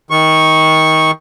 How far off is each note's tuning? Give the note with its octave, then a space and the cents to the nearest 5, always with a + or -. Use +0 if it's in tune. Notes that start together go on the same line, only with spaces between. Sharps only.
D#3 +25 C#6 -10